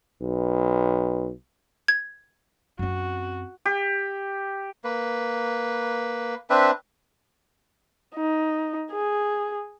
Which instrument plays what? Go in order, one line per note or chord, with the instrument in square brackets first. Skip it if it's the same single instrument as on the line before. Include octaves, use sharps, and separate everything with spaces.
[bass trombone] B1
[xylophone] G#6
[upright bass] F#2 C4 [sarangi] F#4
[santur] G4
[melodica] A#3 B4
C4 D4 B4 E5
[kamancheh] D#4
G#4